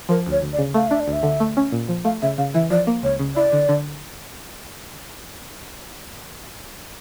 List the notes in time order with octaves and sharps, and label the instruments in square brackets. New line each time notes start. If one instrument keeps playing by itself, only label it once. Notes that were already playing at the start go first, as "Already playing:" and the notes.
[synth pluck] F3 [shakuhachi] A#4
[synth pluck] D2
[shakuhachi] C#5
[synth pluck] D2
[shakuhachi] D5
[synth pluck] C#3
[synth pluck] A3 [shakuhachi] F5
[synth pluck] D4 [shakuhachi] E5
[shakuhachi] D5
[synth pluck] D2
[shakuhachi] E5
[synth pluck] D3
A3
C#4
A#2
F3
[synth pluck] A3 [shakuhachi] F5
[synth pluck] C#3 [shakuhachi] E5
[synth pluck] C#3 [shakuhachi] F5
[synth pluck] E3 [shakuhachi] E5
[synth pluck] F3 [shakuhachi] D5
[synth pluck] A#3
[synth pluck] C#2 [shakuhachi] C#5
[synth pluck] C#3
[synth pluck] E4 [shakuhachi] D5
[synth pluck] D3
D3